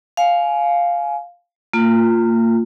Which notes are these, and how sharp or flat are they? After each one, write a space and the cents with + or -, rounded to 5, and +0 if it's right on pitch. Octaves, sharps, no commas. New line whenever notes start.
F5 +0 G#5 +20
A#3 -35 F4 +0